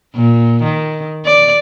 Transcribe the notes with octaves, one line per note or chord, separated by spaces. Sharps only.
A#2
D#3
D5